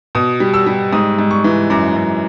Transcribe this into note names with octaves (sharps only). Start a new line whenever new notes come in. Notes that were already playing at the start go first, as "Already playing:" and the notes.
B2 D#6
G3
E6
G3
G#2 D#6
G#2
C#6
E3
F#2 D6
F#2